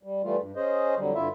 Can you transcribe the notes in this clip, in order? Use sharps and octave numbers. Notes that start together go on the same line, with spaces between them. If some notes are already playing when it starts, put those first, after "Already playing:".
G3
E3 G3 A3 F4
G2
C#4 G#4 C5 D#5
F2 D3 F#3 G3
G2 D3 E4 F4 E5